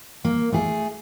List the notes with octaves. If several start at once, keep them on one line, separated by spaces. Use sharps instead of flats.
A#3
A3 G#4